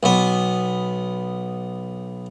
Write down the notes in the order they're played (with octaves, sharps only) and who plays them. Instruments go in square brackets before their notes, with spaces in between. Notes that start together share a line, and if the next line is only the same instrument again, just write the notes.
[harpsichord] B1 B3